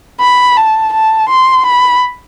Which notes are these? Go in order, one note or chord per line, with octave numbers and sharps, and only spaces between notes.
B5
A5
A5
C6
B5